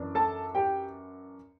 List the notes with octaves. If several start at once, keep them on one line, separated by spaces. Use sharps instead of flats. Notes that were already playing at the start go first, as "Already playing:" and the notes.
Already playing: F#2 E3 B3 D4
A4 A5
G4 G5